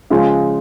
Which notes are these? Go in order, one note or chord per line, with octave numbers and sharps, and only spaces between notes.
C#3 F3 G#3